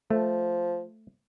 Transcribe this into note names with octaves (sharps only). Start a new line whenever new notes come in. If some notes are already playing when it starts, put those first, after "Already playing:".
F3 A3